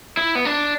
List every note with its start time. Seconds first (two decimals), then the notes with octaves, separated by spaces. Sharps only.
0.17 E4
0.35 B3
0.45 D4